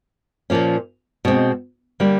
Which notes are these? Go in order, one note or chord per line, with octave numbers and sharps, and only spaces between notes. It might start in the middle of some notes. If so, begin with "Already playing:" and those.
A#2 F3 A#3 C#4
B2 G#3 C4
D3 G3 A#3